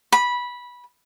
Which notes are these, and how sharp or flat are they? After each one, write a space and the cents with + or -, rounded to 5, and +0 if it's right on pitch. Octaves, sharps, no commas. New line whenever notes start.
B5 -15